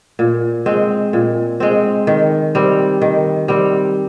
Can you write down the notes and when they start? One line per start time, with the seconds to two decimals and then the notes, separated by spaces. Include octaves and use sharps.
0.19 A#2
0.66 G#3 C4
1.13 A#2
1.60 G#3 C4
2.07 D#3
2.55 G3 C4
3.02 D#3
3.48 G3 C4